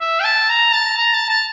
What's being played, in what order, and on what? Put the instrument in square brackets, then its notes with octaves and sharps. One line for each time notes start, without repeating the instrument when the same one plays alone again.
[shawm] E5
G5
A5
A#5
A5
A#5
A5
A5